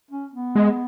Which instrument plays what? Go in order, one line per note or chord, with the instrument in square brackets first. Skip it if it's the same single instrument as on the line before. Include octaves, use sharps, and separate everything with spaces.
[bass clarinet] C#4
B3
[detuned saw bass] G#3